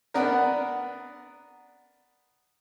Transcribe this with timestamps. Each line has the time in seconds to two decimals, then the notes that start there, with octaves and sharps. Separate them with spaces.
0.14 B3 D4 A#4